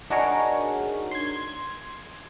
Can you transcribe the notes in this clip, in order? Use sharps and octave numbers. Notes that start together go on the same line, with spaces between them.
D4 D#4 F#4 G#4 A#4 C#5
C6 G#6